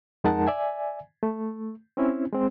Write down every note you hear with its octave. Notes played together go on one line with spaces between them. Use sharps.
F2 G#3 D#4 A#4 F#5 A5
D5 E5 G#5
A3
C4 C#4 E4
G#3 C4